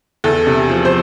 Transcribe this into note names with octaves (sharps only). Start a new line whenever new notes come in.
E2 A4
C3
F3
C5